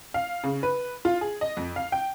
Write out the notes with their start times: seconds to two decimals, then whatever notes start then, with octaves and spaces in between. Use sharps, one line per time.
0.14 F5
0.44 C#3
0.63 B4
1.05 F4
1.21 G#4
1.41 D#5
1.57 F2
1.76 F5
1.92 G5